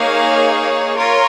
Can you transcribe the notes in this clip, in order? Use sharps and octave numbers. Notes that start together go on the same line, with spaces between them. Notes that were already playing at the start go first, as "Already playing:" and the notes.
Already playing: A#3 D#4 G#4 C#5 F5
F4 A#4 C#5